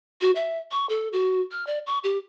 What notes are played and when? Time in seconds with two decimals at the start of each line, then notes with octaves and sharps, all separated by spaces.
0.21 F#4
0.35 E5
0.71 C#6
0.89 A4
1.13 F#4
1.51 F6
1.67 D5
1.86 C#6
2.04 G4